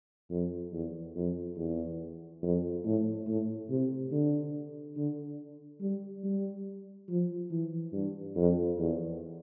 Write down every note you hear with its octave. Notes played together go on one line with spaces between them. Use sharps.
F2
E2
F2
E2
F2
A2
A2
C3
D3
D3
G3
G3
F3
E3
G2
F2
E2